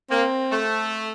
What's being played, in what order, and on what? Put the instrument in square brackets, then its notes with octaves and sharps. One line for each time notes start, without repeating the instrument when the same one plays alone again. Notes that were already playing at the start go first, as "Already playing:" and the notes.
[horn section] A#3 [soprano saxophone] C4
[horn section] A3